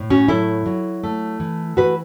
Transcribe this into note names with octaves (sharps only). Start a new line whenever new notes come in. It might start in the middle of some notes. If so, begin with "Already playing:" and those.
Already playing: A2
C#4 F#4
F#3 E4 A4
F#3
A3
E3
E3 F#4 B4